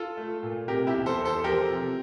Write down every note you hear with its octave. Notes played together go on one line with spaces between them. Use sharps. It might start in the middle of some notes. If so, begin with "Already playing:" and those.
Already playing: F4 A4
A3
A#2
C3 G4 A#4
E4 G4
E2
A4 C5
E2
A4 C5
F3 G4 A#4
C3